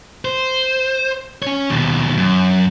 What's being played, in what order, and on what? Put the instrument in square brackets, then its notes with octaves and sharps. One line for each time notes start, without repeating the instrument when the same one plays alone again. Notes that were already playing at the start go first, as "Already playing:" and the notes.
[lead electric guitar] C5
C#4 C#5
D#2 B2
F#2